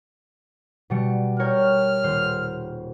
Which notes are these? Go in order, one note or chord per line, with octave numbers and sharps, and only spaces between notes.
B2 G3 C#7
A#4 C#5 G5 F6
D#1 C5